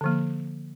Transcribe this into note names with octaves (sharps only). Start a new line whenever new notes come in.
D3 F3 A#3